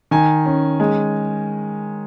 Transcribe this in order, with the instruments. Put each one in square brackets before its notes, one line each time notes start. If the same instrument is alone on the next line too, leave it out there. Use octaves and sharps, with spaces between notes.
[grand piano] D#3 G#5
C#4
G#3